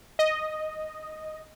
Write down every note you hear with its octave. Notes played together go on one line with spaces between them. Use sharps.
D#5